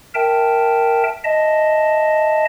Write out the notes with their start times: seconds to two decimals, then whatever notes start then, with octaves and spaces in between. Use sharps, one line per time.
0.15 A#4 E5 G5 A5
1.24 D#5 E5 A5